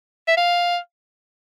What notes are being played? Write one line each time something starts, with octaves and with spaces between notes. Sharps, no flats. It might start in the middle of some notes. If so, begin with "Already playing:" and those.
E5
F5